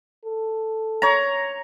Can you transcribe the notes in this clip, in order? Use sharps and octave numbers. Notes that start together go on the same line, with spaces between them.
A4
C#5 A#5